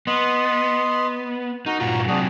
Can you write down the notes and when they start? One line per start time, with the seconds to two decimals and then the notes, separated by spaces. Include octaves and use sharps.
0.07 B3 D#5 C6
1.66 D#4 F#4 A#4
1.80 G2 A#2 F4 F#4 A#5 C#6
2.08 C3 F#3 D4 F#4 G#4